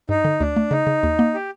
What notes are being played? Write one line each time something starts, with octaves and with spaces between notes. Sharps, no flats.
G2 D#4
D3
D2 D4
A3
C#3 D#4
C#3
D#2
A#3
G4